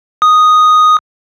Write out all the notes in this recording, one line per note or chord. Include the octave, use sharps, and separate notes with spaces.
D#6